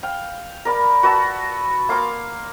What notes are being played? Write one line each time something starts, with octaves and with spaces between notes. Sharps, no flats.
F5 G5
A#4 D5 B5
F#4 B4 E5 A5
A#3 F5 C6 D6